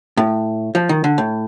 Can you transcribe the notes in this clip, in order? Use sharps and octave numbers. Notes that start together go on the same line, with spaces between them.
A2
F3
D#3
D3
A2